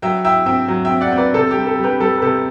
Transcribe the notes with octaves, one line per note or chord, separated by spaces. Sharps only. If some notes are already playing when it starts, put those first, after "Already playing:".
F#3 E5 G5
E4 E5 G5
C4 E5 G5
F#3
E5 G5
C4
D5 F#5
C4
B4 D5
C3 A4 C5
G4
G3
A4
G3
G4 B4
G3 A4
B4
C3 A4